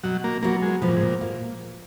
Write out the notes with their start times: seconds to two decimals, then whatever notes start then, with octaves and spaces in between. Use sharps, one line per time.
0.04 B2 F#3
0.24 A#3
0.43 F#3 A#3 B3 F#4
0.62 G#3
0.82 B2 F3
0.89 A#2
0.97 G#2
1.03 A#2
1.21 A#3